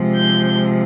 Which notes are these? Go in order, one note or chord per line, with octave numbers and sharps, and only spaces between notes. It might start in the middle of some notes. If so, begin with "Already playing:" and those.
Already playing: C3 F3 G#3
G6